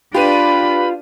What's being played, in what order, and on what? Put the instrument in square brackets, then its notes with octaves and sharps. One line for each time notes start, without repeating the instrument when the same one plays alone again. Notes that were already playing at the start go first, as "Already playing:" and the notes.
[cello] D4 [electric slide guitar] F4 [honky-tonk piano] G4 B4 D#7 [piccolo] B5